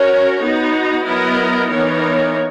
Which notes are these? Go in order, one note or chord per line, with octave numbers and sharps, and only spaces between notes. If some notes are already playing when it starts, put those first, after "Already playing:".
Already playing: C#4 F#4 A#4 C#5
B3 D#4 F#4
F#3 B3 E4 A#4 D#5
E3 B3 D#4 A#4 C#5